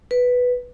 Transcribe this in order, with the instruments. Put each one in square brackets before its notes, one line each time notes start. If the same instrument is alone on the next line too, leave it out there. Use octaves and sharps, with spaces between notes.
[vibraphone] B4